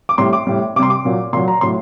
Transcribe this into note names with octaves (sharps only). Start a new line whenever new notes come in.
D6
A2 G3 C6
D6
A2 G3
C3 G3 C6 D6
D6
A#2 F#3
A#2 F#3 C6
A#5
A2 F#3 C6